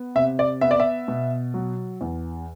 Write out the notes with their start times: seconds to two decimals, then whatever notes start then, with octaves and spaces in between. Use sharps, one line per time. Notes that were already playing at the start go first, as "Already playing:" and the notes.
Already playing: B3
0.15 C3 E5
0.39 D5
0.61 B3 E5
0.71 D5
0.80 E5
1.08 B2
1.54 F#3
2.01 E2